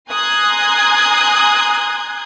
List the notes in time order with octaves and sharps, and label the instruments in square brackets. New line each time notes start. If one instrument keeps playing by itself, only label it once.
[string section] G#5 A#5 C6 D#6 F#6 G#6